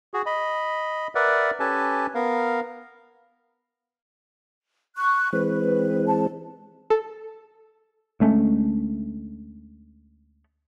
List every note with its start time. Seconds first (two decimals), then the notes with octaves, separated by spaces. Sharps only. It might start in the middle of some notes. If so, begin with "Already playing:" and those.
0.14 F#4 G#4
0.26 D#5 B5
1.15 A#4 B4 D5 E5 F#5
1.60 C#4 G4 A4 B4 G#5 A5
2.15 B3 A#4 F5
4.96 C#6 F#6
5.33 E3 G#3 C4 B4
6.07 A5
6.90 A4
8.20 D2 G#3 A3 C#4